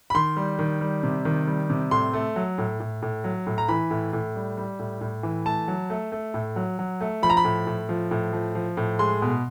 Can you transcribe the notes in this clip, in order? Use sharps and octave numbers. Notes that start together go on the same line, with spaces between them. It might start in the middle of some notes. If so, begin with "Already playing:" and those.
B5
D#3 C6
G3
D#3
G3
C3
D#3
G3
C3
A2 C6
A3
F#3
A2
A2
A2
F#3
A2
A#5
E3 B5
A2
A2
G3
G3
A2
A2
E3
A3 A5
F#3
A3
A3
A2
F#3
F#3
A3
F3 B5
A#5
B5
A2
A2
F3
A2
F3
F3
A2
G#3 C6
B2